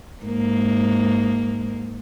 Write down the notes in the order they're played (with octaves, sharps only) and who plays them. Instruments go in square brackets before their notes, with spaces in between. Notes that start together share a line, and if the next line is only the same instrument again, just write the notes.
[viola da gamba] G#2 A#3